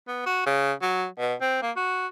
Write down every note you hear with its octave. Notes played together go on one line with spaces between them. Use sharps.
B3
F#4
C#3
F#3
B2
C4
A#3
F#4